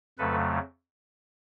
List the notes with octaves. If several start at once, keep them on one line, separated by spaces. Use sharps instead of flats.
F2 C#3 F#3 A3 A4 B4